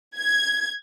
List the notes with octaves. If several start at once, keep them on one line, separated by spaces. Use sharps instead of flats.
G#6